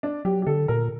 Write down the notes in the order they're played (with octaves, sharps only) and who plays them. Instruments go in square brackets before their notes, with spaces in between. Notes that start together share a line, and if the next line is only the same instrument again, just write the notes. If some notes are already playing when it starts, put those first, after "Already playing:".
[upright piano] D4
[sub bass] F#3 [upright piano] G4
[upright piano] G4
[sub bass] D3 [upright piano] A4
[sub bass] A#2 [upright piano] A#4